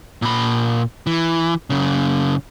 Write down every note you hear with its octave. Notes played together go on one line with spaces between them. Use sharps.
A#2 B5
E3
F#2 C#3